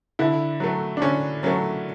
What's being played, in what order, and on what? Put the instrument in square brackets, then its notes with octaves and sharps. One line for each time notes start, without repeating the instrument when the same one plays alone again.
[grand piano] D3 E4
F#3 A3
D4
D3 C#4
F#3 A3 C#4